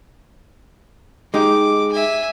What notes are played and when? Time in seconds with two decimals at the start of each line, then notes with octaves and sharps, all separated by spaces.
1.34 G#3 D#4 G4 D6
1.92 E5 G#5